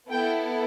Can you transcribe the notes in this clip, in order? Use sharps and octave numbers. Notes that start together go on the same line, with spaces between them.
B3 E4 A4 G5